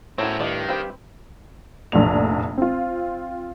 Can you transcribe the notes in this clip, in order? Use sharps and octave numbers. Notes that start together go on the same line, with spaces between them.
A2 C4 C#4 F#4 A#4 C#5
G2 D#3 F4 D5 D#5
C4 G4 B4 F5 G5
F1 A#1 A2 D4 F7
C4 F4